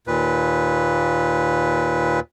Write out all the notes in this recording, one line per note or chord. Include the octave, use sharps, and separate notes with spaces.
D#2 A#2 B4